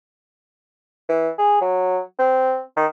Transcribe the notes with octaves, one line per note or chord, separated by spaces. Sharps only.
E3
G#4
F#3
C4
D#3